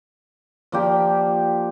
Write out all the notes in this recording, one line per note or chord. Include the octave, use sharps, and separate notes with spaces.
F3 A#3 D4 G4